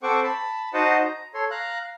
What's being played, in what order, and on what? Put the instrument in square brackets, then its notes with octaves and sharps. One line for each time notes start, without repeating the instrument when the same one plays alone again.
[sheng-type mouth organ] C4 A4 C5 F#5 C#6 D6
A5 B5
D#4 F#4 C5 D#5 F#5 A5
A#5
A4 C#5 C6
F5 A#5 F#6